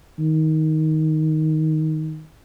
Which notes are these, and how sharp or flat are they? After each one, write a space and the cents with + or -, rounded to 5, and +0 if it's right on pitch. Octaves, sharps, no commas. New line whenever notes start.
D#3 +10